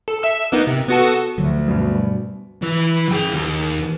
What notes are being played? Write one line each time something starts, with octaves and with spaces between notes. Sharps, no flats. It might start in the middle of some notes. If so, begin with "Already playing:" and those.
A4
E5 E6
A#3 B3 D#4
C3
B3 F#4 A4
D2 D3 F3 F#3
G2 B2
E3 B4
G#4 G5
D#2